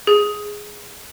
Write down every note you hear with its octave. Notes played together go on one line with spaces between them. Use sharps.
G#4